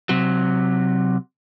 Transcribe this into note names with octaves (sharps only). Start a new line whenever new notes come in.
C3 F#3